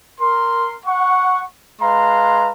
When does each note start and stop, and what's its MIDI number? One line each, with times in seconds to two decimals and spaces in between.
0.20 0.78 70
0.20 0.78 84
0.86 1.43 78
0.86 1.43 85
1.81 2.52 56
1.81 2.52 71
1.81 2.52 77
1.81 2.52 82
1.81 2.52 84